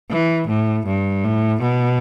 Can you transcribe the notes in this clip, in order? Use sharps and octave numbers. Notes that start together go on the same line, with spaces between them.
E3
A2
G2
A2
B2